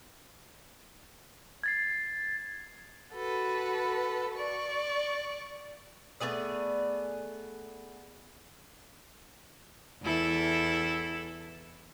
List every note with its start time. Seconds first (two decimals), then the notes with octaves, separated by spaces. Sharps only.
1.63 G#6 A6 C7
3.13 F#4 A4 B4
4.32 D5 C#6
6.20 A3 B3 G#4 D5
10.02 E2 E4 A4